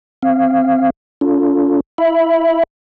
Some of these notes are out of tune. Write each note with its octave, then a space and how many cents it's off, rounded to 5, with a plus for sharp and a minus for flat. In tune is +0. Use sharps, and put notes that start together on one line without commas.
C4 +0 F5 -20
C#4 +45 F4 +0 A4 +0
E4 +0 E5 +5 B5 +0